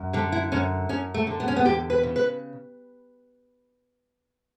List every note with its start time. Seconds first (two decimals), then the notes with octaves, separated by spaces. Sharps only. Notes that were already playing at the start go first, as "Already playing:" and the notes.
Already playing: F#2
0.13 D3 G3
0.32 E4
0.52 F#2 C#4
0.89 F#2 C#4
1.14 A3
1.27 D3
1.40 B3
1.48 C#4
1.56 B3
1.65 E2 G4
1.90 B4
2.03 C#3
2.16 B4